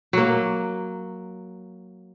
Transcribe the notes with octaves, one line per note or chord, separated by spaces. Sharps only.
F#3 A#3